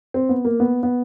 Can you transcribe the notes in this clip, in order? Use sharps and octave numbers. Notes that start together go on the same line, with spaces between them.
C4
B3
A#3
B3
B3